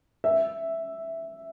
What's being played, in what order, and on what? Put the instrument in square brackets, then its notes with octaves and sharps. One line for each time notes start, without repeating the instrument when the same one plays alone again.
[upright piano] E5